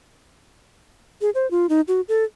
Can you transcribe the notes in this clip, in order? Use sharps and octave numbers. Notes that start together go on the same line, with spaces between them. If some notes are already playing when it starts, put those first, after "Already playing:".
G#4
C5
F4
D#4
F#4
A4